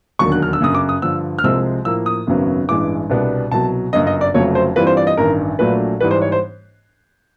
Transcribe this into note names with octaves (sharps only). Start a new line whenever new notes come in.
E1 D#2 D3 F#3 C#6
F#6
F6
E6
G1 F#2 C#3 D#6
D6
D#6
G2 D3 F3 E6
F6
C2 C3 F3 G#3 C4 E6
A2 F3 A#3 E6
D#6
G#1 F#2 C#3 F#3 B3
A1 G2 E3 G#3 D6
C2 B2 G3 B3 D4
C2 B2 F#3 A5
G1 F#2 C#3 D#5
D#5
D5
F1 F2 C#3 F#3 A3 C#5
C5
G2 E3 G3 C4 F4 B4
C5
D5
D#5
A1 G2 D#3 A#4
A#1 A#2 F#3 A3 D4 B4
G#2 E3 G3 B4
C5
C#5
C5